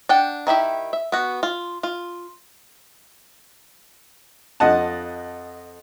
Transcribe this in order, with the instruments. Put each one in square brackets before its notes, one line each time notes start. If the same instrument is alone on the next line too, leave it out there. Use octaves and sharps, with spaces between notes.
[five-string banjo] D4 F#5 G5
D#3 E4 G4 E5
E5
B3 F#4
F4
F4
[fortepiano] F2 D#5 F#5 A5